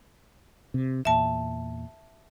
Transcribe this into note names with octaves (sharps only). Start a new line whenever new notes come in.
C3
E2 A#2 E5 A5